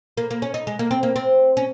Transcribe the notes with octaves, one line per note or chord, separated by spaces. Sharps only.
A#3
A#3
C#4
D#4
G#3
A#3
C4
A#3
C4
C#4